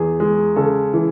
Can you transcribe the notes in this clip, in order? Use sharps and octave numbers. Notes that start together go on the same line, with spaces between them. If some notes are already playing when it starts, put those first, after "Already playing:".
Already playing: E2 G#4
G#3
C#3 A4
E3